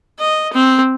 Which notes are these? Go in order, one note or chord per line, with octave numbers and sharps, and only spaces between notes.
D#5
C4